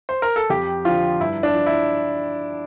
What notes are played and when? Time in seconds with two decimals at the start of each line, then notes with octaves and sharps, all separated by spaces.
0.09 C5
0.22 A#4
0.36 A4
0.50 F2 G4
0.85 D3 F3 F4
1.20 G2 E4
1.43 D4
1.54 F3
1.66 E4